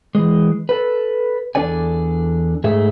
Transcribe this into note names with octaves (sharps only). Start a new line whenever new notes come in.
E3 G#3
A4 B4
E2 D4 A4 D5 G#5
G#2 A3 G#4 E5